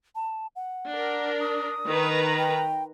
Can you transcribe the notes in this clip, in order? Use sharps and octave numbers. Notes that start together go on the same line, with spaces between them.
A5
F#5
D4 A#4
D#6
D#3 B4 A#5
G5